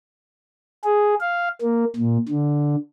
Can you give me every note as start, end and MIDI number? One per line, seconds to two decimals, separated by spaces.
0.85 1.15 68
1.20 1.48 77
1.61 1.84 58
1.96 2.17 46
2.28 2.75 50